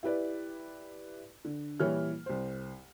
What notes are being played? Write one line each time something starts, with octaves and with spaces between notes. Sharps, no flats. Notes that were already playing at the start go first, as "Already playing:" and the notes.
E4 G4 B4 D5
D3
A#2 E3 G3 C#5 F6
C2 C5